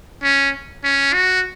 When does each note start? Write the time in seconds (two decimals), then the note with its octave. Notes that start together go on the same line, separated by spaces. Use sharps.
0.23 C#4
0.84 C#4
1.13 F#4